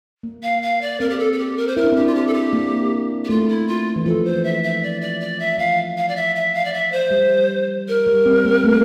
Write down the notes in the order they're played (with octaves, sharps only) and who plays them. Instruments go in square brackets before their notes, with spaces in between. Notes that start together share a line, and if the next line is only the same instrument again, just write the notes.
[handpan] A#3
[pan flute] F5
F5
D5
[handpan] C4 [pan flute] A#4
[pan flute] G4
A4
A4
G4
A#4
C5
[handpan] E4 [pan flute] A#4
[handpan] D4
[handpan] C4 [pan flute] G4
[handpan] D4
[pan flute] F4
G4
A4
G4
[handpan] A#3
[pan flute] G4
[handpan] A3 [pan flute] F4
[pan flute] E4
F4
[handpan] E3
[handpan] F3 [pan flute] A4
[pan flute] C5
E5
E5
D5
D5
D5
E5
[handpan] F3 [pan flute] F5
[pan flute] F5
D5
E5
E5
F5
D5
E5
C5
[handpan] G3
[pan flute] A#4
[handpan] G3
C4
A#3
A3